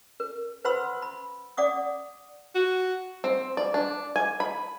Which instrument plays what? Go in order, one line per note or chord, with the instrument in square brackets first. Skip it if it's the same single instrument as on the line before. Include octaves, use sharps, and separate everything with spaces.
[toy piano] A#4
B4 C5 F#5 B5 C6 E6
B5
D5 F#5 D6 D#6
[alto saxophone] F#4
[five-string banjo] C4
D5
D4
G#5
B5